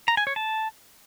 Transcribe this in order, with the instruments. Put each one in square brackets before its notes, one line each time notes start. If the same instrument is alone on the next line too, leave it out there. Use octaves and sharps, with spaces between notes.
[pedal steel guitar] A#5
G#5
C#5
A5